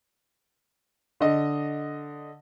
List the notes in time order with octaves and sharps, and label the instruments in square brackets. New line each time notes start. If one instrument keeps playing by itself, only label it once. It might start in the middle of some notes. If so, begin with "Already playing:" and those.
[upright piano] D3 D#5